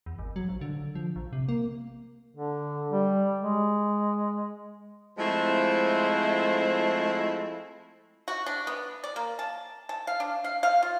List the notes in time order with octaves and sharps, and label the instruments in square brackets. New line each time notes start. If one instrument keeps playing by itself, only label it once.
[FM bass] E2
G#1
F#3
A#1
D3
F3
A#1
C3
A#3
[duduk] D3
G3
G#3
[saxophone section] F3 G#3 A3 C4 E4
[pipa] F#4
D4
B3
D5
A#3
A5
A5
F5
D4
F5
F5
F4